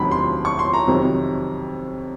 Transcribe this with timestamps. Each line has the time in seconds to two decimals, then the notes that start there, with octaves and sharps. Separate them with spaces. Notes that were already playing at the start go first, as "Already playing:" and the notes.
Already playing: E1 D2 C3 D#3 F#3 B5
0.11 C6
0.45 C#6
0.59 C6
0.73 A#5
0.87 F2 C3 D#3 F#3